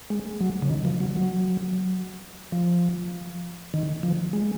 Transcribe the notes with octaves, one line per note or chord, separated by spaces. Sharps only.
G#3
F#3
C#3
D#3
F3
F#3
F#3
F3
D#3
F3
G#3